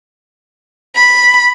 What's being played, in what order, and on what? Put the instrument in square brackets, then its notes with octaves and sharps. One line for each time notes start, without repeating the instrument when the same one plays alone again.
[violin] B5